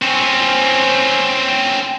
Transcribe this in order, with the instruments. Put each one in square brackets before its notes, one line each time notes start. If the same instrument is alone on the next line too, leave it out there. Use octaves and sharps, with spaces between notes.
[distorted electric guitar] C4 C#4